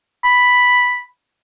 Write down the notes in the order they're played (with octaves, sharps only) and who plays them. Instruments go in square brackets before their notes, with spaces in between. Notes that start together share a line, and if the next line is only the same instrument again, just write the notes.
[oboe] B5